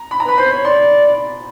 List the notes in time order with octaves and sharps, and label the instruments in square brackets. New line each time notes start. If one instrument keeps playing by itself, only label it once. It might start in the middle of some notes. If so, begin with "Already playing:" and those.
Already playing: [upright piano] A#5
B5
A#5
[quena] B4 [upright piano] B5
[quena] C5 [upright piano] B5
[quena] C#5
[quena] D5 [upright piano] C6